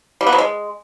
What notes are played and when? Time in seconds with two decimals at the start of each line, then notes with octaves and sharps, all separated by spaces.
0.21 G3
0.27 B3
0.32 F#3
0.38 G#3